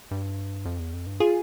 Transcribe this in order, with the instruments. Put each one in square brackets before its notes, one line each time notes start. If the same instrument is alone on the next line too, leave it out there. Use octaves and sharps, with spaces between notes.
[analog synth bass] G2
F2
E2
F2
G2
[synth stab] F4 G#4